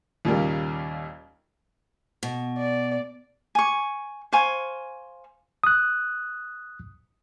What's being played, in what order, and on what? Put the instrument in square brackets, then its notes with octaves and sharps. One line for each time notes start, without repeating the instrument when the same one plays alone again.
[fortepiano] D#2 A#2 C#3 G3 A#3
[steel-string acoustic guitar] B2
[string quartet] D5
[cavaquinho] G#5 C#6
C5 F5 G#5 C#6
[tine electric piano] D#6 F#6